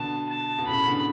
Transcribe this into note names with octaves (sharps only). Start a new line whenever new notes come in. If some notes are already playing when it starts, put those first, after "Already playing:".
Already playing: B2 D3 A5
A5
B2
A2 C#3 B5
B2 D3